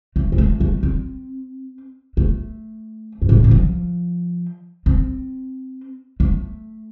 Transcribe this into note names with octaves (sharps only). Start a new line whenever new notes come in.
A3
C4
A3
A3
C4
A3
G2
A2
C3
D3
F3
C4
A3